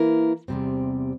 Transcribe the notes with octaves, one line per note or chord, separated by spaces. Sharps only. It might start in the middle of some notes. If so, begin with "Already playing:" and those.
Already playing: E3 A#3 E4 A#4
E2 C3 G3 C4